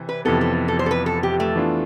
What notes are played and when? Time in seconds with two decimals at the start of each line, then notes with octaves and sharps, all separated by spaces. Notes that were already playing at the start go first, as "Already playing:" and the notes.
Already playing: C3 E3
0.09 B4
0.25 F2 C3 E3 B3 A4
0.41 A4
0.68 A4
0.79 C5
0.86 A4
0.91 B4
1.06 A4
1.23 G4
1.40 A3
1.55 E3 B3 D4 F4